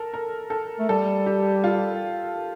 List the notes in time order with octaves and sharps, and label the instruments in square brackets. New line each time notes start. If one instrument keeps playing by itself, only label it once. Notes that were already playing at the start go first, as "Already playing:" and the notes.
Already playing: [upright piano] A4 A#4
A#4
A4
[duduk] A3
[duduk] G3 [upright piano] A4
[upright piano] G4
F4